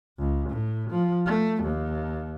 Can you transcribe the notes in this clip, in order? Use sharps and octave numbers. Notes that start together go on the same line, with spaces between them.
C#2
A2
F3
A3
D#2